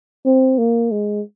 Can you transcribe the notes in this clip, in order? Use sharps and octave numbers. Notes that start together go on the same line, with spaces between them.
C4
A#3
G#3